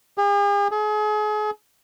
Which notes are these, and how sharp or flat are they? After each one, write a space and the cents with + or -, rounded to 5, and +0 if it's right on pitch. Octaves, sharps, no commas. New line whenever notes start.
G#4 -45
G#4 +35